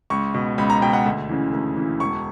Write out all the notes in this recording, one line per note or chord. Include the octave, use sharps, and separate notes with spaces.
C#2 C#6
B2
C#2 B5
A#5
B2 G5
F#5
D2
C#3 E3
D2
C#3 E3
E1 C#6